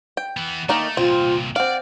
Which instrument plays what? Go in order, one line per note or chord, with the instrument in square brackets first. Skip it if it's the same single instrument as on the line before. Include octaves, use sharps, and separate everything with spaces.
[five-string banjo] G5
[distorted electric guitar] E3 B3
[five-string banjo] D#3 A#3 D#4 [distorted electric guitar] A3
[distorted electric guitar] C2 A#2 [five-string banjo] C4 [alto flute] F4
[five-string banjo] C4 F5 [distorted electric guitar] D5 [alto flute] F#5